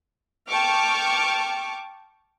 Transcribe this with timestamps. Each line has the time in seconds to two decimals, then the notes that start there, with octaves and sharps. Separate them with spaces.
0.48 G5 A5 C#6 D6 F6